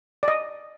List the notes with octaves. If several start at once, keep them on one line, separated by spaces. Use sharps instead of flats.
D5
D#5